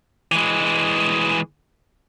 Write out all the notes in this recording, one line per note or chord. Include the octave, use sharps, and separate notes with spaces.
E3 G#3